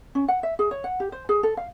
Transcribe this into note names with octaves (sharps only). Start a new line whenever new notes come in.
C#4
F#5
E5
G#4
C#5
F#5
G4
C5
G#4
A4
F5